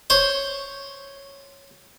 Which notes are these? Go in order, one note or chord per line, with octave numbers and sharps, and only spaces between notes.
C5 C#5